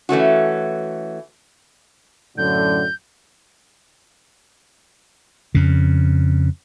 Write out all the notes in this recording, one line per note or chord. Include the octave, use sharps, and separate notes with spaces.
E3 A3 C#4 F#4
F#2 A2 D3 G6
F2 C#3